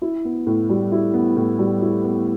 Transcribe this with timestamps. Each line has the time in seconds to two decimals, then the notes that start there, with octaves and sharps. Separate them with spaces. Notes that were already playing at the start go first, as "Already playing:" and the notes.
0.02 E4
0.25 B3
0.47 A2
0.69 G3
0.92 E4
1.14 B3
1.36 A2
1.59 G3
1.82 E4
2.04 B3